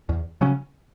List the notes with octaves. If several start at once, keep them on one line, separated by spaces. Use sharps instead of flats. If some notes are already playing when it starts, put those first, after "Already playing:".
E2
C#3 F#3 C#4